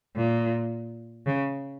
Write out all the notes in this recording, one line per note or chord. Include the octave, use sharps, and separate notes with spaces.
A#2
C#3